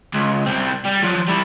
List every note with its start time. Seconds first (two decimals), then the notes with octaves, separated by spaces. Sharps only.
0.13 C#2
0.46 C2 C4
0.85 G3
1.03 F3 F#3
1.28 G3 E4